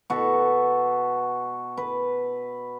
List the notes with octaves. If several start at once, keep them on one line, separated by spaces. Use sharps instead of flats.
B2 F#4 A4
B4